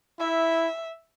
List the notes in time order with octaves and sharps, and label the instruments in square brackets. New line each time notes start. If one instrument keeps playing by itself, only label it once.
[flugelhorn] E4 [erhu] E5